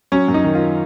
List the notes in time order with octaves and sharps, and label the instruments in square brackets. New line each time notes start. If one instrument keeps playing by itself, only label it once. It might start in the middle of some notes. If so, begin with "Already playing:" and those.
[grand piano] F#3 C#4 C#5
F#2
D#4
D#3
F4